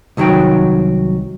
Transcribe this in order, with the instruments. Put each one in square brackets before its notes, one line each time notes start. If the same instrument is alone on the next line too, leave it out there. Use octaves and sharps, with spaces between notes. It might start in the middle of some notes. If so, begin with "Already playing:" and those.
[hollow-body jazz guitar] C2 D#3 F#3 F#4 G5